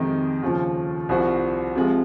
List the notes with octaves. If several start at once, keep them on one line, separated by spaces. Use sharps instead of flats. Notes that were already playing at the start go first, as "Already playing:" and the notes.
Already playing: F2 C3 D#3 G#3 D#4
D#2 C#3 F3
C2 C3 F3 C4 F#4
C3 F3 G#3